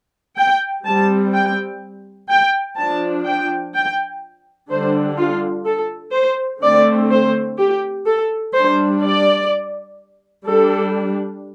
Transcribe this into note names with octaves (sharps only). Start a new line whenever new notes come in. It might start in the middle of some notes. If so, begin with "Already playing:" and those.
G5
G3 C4 A5
G5
G5
F3 D4 A5
G5
G5
D3 G3 D4 C5
F4
A4
C5
D3 A3 C4 D5
C5
G4
A4
G3 D4 C5
D5
G3 D4 A4